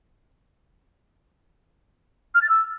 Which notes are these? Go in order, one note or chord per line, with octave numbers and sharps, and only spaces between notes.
F6
A6
E6